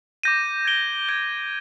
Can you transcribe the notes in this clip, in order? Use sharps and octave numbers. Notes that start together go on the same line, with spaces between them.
D6 G6 A#6 D#7
G#6 D7 G7
G#6 D7 G7